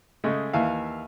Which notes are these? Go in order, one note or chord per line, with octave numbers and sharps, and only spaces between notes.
C#3 G#3 A3
D#2 E3 E5 F5